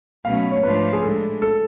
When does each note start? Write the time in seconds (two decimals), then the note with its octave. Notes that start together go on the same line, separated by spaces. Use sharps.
0.25 B2 F#3 A3 C#4 F5
0.51 C#5
0.63 G#2 F3 A3 D4 F4 B4
0.93 G#4
1.02 A2 G#3 D4 A4
1.42 A4